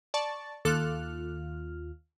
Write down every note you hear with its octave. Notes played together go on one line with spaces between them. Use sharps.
D5 A5 C#6 A6
D#2 F4 A4 D6 F6 F#6